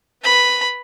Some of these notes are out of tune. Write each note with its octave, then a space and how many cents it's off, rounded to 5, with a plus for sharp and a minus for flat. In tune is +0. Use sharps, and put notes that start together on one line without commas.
B4 +0 B5 +0